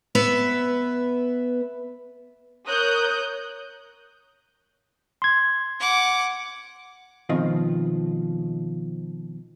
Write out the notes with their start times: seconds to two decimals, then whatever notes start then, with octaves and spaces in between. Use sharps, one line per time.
0.15 B3 B4 E5
2.66 A#4 C#5 D#6 F#6 G6
5.22 C6 G#6
5.80 F#5 D6
7.29 B2 D#3 F3 G#3 C4 F4